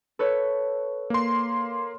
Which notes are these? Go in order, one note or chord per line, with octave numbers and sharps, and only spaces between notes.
A4 B4 C#5
A#3 C6